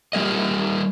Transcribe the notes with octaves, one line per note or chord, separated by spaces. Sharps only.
G3 A#3 D#5